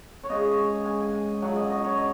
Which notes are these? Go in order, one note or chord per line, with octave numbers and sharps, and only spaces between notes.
C#5
C#3 G#3 D#5
G#5
G#5
C#3 F#3 F#5
D#5
D#5
C#5
D#5